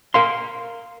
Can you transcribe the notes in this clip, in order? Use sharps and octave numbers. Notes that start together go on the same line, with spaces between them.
A#4 F5 C6